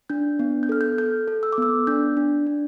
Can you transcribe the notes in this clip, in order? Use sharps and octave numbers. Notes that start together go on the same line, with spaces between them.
D4 G6
B3
G6
A4 F6
G6
A4 G6
A4
E6
D6
B3 E6
D4 G6
D4
D4